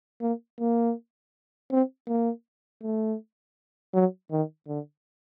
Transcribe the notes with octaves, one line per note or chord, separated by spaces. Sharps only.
A#3
A#3
C4
A#3
A3
F#3
D#3
D3